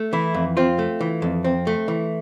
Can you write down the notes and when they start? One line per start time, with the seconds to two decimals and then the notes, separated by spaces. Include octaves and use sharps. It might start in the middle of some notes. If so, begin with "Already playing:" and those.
Already playing: A3
0.13 E3 E4
0.34 F2
0.57 C4 F4
0.79 A3
1.01 E3
1.22 F2
1.44 C4
1.67 A3
1.88 E3